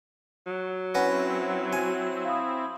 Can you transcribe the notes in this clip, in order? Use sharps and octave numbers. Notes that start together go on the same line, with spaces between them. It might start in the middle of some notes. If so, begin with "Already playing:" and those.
F#3
C4 C#4 E4 F#4 B4 F#5
F#4 G#5
F5 B5 D#6